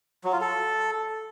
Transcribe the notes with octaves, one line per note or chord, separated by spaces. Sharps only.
F#3
F4
A4